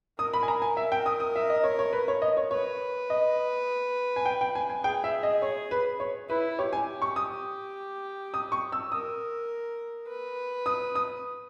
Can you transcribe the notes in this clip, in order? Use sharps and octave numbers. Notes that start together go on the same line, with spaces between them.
A#4 D#6
B5
G#5
A#5
G#5
E5
G5
D#6
D#6
E5
D#5
C#5
C#5
B4
C#5
D#5
C#5
B4 C#5
D#5
G#5
G5
G5
G#5
G#5
G#4 G5
E5
D#5
C#5
B4
C#5
E4 B4
G4 C#5
G#5
C#6
D#6
D#6
C#6
E6
A#4 D#6
B4
D#6
D#6